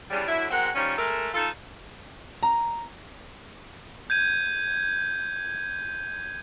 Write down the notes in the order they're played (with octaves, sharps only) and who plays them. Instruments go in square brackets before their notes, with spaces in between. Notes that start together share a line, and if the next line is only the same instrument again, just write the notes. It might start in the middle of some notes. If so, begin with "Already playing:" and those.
[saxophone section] E2 C#3 G3
D3 F#3 E4
G#3 C4 F#4 A#4 F#5
D#3 F3 G3 C#4
G#3 A3 A4 A#4
D#4 F4 A4
[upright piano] A#5
[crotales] G6 G#6 D#7